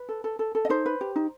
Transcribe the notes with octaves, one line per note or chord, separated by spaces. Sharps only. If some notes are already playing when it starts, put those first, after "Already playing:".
Already playing: B4
A4
A4
A4
A4
D#5
D#4 C5
B4
G4
D#4